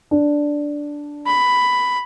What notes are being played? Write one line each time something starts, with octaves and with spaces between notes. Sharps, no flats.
D4
B5